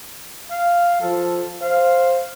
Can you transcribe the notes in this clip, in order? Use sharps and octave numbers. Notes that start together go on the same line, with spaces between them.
F5
F3 A4
C5 F5